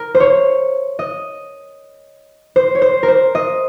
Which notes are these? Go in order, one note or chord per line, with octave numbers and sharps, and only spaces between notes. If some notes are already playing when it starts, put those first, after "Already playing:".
Already playing: A#4
C5
C#5
D#5
C5
C#5
C5
A#4
C5
D#5